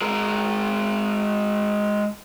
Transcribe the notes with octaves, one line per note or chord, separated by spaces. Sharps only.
G#3 A#4